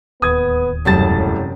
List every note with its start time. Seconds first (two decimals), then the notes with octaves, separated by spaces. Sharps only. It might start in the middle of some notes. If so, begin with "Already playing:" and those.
0.22 D1 D#2 B3 D#6 G#6
0.85 E1 F#2 A2 C3 G3 A5 A6